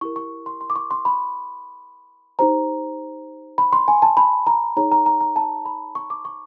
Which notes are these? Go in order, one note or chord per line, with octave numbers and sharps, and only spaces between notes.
E4 G4 A#4 C#6
C#6
C6
C6
D6
C#6
C6
B5
D#4 G4 C5 A#5
B5
C6
G#5
A5
B5
A#5
D#4 G#4 C#5 A#5
A#5
A#5
A#5
A5
B5
C#6
D6
C#6